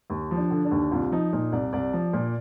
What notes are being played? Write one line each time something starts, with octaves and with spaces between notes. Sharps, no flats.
D#2
F3
D4
D3
D4
D#2
C2 F4
F3 D#4
A#2 D#4
C2 D5
C2 D5
F3
A#2